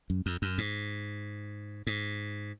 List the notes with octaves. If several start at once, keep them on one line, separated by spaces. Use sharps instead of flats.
F#2
F2
F#2
G#2
G#2